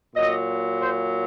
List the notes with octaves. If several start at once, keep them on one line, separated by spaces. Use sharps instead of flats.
A#2 F#3 D#5
C5